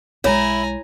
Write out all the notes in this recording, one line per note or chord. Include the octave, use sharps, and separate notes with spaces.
B1 G#3 E4 C#5 G#5 A#5